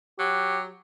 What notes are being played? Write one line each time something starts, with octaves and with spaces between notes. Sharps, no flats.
F#3 G4